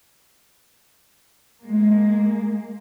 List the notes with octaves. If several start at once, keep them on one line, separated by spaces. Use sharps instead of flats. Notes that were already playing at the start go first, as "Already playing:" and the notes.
G#3 A#3